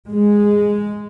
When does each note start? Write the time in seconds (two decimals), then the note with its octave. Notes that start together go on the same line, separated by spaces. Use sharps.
0.10 G#3